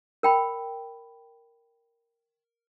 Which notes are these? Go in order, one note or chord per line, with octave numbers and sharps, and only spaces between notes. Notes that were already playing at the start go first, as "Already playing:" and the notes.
A#4 G5 B5